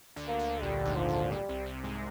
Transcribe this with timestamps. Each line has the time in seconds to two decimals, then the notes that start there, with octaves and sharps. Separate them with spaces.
0.16 D2 D3
0.28 A#3
0.39 D2 D3
0.62 A#1 A#2 G3
0.85 G#1 G#2
0.97 F3
1.08 G#1 G#2
1.32 A#1 A#2 G3
1.49 C2 C3
1.66 C2 C3
1.84 G#2 G#3